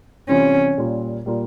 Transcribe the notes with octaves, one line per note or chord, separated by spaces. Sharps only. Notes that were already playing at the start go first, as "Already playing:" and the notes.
C3 E3 G3 C4 C#4 F4
A#2 G3 A#3 F4
A#2 G3 A#3 F4